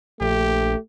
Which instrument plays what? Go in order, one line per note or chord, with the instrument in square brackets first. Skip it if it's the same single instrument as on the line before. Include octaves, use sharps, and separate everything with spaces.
[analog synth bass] A#1 [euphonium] A3 [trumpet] G4